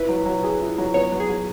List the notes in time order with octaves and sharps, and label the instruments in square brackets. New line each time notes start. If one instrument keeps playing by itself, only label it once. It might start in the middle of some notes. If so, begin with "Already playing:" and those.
Already playing: [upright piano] E4 [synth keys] B4
[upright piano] F#3
F#3
G#4
E4
F#3
[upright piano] B3 [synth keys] C#5
[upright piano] F#3
[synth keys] G#4
[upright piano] F#3